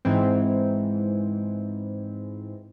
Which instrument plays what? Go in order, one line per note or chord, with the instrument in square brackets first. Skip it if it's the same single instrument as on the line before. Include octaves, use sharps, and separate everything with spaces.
[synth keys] G#2 E3 C4